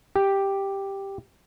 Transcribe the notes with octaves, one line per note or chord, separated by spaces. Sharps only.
G4